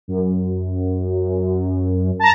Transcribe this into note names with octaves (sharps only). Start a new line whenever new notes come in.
F#2
A5 A#5